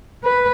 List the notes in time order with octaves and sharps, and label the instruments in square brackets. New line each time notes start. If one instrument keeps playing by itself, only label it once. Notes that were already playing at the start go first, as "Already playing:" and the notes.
[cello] B4